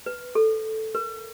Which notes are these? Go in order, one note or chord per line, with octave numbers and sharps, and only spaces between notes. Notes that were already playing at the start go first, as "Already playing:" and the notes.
B4
A4
A#4